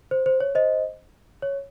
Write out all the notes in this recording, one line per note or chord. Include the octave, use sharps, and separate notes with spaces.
C5
C5
C#5
C5 D#5
C#5